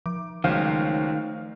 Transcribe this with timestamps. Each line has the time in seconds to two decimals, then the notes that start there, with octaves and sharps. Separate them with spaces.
0.06 F3 D6
0.44 C#2 D#3 F3 F#3 A3 C5 F5